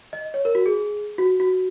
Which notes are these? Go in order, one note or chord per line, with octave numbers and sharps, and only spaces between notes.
D#5
C#5
A#4
F#4
G#4
F#4
F#4